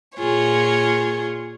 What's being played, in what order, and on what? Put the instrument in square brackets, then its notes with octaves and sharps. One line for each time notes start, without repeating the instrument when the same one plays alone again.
[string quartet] A#2 F4 G#4 C#5